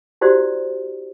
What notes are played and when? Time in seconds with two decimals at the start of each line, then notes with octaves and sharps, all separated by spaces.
0.21 E4 F#4 G4 C5 D5